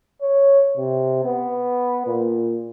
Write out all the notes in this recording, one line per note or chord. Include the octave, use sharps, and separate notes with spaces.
C#5
C3
B3
A#2